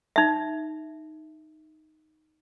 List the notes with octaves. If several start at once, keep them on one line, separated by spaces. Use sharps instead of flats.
D#4 E5